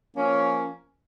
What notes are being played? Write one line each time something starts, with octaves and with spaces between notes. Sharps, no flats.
F3 A#3 C#4